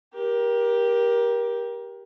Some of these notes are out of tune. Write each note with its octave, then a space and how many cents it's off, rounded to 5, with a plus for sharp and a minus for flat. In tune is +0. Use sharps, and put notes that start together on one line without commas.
G4 +0 A#4 +25